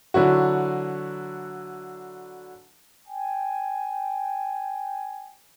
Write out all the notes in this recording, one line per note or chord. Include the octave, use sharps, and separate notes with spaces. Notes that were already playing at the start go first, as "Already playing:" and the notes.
D3 F#3 E4 F#4
G5 G#5